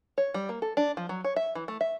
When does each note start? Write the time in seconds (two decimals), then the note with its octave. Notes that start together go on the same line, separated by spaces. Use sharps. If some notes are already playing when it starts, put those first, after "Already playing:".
0.18 C#5
0.34 G3
0.49 A#3
0.62 A4
0.77 D4
0.97 F3
1.09 F#3
1.24 C#5
1.36 E5
1.55 E3
1.68 A3
1.81 E5